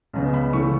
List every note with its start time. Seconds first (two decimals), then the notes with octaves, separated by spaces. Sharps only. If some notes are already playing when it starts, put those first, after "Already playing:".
0.13 C#2 C#3 G#3 B3
0.34 B5
0.53 C#2 C#3 E3 A3 C#6